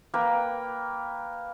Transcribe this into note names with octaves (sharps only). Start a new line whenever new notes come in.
A#3 B4 G5